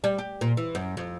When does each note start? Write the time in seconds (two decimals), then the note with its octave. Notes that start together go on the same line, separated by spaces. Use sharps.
0.04 G3
0.18 G4
0.41 A#2
0.57 E3
0.75 F#2
0.97 F2